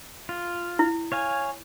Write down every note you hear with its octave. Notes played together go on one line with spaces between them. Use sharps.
F4
E4
C#5 F5 G#5